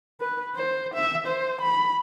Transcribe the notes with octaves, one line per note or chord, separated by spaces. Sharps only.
B4
C5
E5
C5
B5